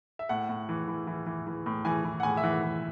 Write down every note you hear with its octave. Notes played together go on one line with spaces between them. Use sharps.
E5
A2 F#5
A2
E3
E3
E3
E3
E3
A2
E3 G#5
E3
F#5
A2 G#5
E5
E3 F#5
E3